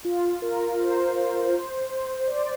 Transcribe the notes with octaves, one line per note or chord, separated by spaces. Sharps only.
F4
A#4
C5
D5